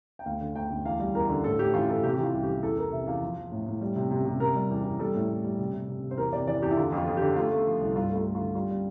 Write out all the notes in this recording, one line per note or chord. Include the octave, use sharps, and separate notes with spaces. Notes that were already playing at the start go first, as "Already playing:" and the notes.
G5
D2 F5
D3
D2 G5
D2
E2 F5
G3
E2 A#4
D3
A2 A4
A2 G4
E3 F4
E3 A4
C3 G4
E3 G4
F4
C2
E3 G4
E2 A4
E2 A#4
C3 E5
E2 F5
F3
F3
A2
A2
G3
C3
C3
C3
C3 A#4
G3
E2
E2
G3 A4
A2
A2
G3
C3
C3
C3
C3
C5
E2 A#4
C3 D5
E3 D5
E2 G4
E4
D3 F4
F2 F4
F2
D3 G4
A3 F4
A3
F3
C2
G2 F4
A3
F4
A3
D3 F4
G3 F4
G3